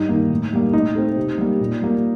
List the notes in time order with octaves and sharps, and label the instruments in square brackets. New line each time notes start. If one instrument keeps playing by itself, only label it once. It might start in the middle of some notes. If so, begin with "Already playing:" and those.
Already playing: [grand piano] G2 D#4
D#3 A#3
A2
G3 A#3
A2 D#4
A3 C4
C3
G3 A#3
A#2
G3 A#3